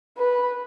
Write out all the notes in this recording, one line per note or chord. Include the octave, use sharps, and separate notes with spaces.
B4